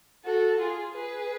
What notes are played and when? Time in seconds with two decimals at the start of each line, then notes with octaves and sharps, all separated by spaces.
0.24 F#4 A4
0.59 F4 G#4
0.95 G#4 B4